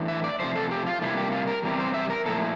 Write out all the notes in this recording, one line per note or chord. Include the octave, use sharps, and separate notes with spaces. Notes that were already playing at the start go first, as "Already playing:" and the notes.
Already playing: A2 E3 D4
E5
D5
C3 F3 A3 C5
A4
G4
F4
C3 G3 A#3 D4 E4
G4
F4
A#4
E2 C3 G3 C4 E4
C5
E5
A#4
A#2 F3 A3 E4 A4